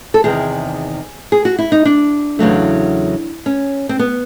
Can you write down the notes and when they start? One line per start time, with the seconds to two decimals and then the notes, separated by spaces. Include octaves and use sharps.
0.14 A4
0.24 E2 C3 D#3 G#4
1.32 G#4
1.45 F#4
1.58 E4
1.72 D#4
1.85 D4
2.39 E2 C#3 F#3 A3
3.46 C#4
3.89 C4
3.99 B3